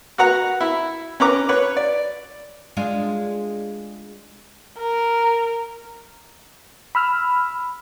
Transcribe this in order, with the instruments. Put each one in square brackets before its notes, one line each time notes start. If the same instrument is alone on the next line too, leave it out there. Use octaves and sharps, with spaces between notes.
[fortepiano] F#4 B4 F#5 A#5
E4
C#4 B4 A#5 D6
B4 C#5
D5
[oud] G#3 D4 F4
[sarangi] A#4
[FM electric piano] B5 E6 F6